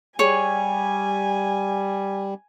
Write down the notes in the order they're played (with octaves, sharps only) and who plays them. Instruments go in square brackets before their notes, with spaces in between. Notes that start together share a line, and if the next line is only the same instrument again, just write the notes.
[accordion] G3 [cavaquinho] G#4 C#5 [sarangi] G#5